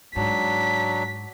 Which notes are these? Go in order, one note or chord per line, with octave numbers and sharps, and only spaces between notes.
G#2 F#3 D4 B6